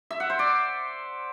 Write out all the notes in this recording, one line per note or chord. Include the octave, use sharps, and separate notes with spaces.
E5
F#5
C5
D5